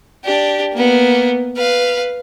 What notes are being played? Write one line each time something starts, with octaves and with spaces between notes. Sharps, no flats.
D4 G4
A#3 B3
B4 F5